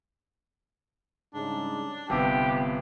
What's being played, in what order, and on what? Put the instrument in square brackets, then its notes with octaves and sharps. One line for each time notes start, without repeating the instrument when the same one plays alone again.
[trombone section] G#2 C#3 G3 [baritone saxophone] D4
[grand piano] G1 C3 [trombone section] B3 [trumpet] G4